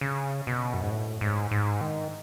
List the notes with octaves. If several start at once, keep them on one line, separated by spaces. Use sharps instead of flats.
C#3
B2
F#2
G#2
A2
G#2
G#2
D#3